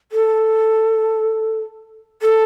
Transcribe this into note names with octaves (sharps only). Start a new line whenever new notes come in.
A4
A4